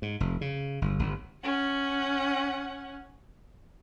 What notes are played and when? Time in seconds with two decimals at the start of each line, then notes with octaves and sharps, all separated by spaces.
0.02 G#2
0.20 F1
0.41 C#3
0.82 G1
0.99 G1
1.44 C#4 F#5